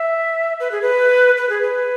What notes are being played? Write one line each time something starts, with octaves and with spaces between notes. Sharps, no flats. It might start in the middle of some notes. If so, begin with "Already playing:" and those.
Already playing: E5
B4
G#4
B4
B4
G#4
B4